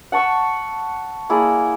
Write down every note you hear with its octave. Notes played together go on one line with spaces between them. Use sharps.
F#5 A5 C#6 E6
A#3 E4 G#4 D5